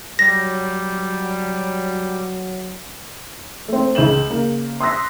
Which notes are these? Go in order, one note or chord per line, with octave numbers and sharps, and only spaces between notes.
F#3 G3 A#6
A3 C4
C#2 G6 E7 F#7
C#3 A#3
C6 D#6 E6 F#6 A#6 B6